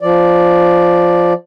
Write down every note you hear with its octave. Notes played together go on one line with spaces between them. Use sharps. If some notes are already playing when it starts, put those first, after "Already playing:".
F3 D5